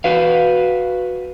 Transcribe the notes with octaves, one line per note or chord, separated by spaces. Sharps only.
F#4 B4 F5